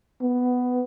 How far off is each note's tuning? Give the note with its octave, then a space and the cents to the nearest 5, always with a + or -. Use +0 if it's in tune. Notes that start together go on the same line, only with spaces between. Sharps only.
B3 +10